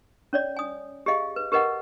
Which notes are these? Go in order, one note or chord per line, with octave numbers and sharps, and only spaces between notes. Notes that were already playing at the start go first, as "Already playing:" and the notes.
C#4 C#5 D5
G#5 D#6
G4 G#4 D#5 F5
B4
G4 A#4 B4 D#5 F#5